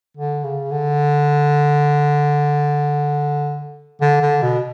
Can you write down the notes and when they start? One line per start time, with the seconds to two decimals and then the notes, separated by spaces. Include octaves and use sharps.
0.17 D3
0.44 C#3
0.71 D3
4.01 D3
4.22 D3
4.42 B2